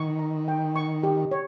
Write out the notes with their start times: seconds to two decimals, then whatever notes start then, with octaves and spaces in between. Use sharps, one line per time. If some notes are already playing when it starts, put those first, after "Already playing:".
Already playing: D#3 C#6
0.19 A#5
0.48 G5
0.76 C#6
1.03 G4
1.31 C#5